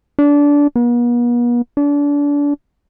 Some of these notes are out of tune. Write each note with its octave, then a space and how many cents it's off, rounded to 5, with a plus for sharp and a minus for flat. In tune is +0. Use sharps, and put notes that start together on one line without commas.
D4 -20
B3 -45
D4 -30